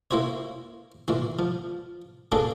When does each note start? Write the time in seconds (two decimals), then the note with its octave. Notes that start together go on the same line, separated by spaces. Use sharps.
0.11 A#3 E4 F#4 C5 C#5
1.08 A#2 E3 F#4
1.39 F3
2.32 A#3 B3 D4 F#4 G#4 A4